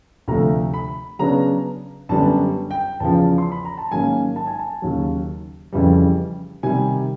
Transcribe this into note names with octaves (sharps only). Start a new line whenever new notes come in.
D2 C3 F3 A3 A#5
B5
C#3 F#3 B3 D4 A#5
F#2 D3 G3 B3 D4 A5
G5
E2 C#3 F3 A5
C6
B5
A#5
A5
G#2 D#3 F#3 A#3 C#4 G#5
A5
G#5
A5
D#2 C#3 F#3
F2 C#3 E3 G3
C3 D#3 G3 G#5